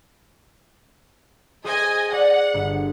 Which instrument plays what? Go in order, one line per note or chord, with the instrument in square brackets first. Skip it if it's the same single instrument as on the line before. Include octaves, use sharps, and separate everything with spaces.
[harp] G#4 C5 D#6 [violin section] D#5 G#5
[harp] D5 [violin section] F#5
[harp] G1